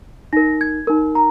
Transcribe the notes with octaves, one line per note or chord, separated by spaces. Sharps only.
D#4 A#4 A#6
G#6
D#4 A#4
A#5